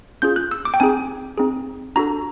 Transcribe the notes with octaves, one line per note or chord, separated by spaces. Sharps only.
C#4 F4 G#4 G6
F#6
E6
D6
G5
C4 D#4 G#4 G#5
C4 D#4 G#4
D4 F#4 A4 A#5